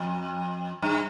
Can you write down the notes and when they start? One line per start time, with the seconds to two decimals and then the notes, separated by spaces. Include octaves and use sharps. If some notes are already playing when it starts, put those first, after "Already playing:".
Already playing: F2
0.82 G2